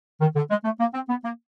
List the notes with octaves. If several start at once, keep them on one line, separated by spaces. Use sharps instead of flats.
D#3
D3
G#3
A3
A#3
C4
B3
A#3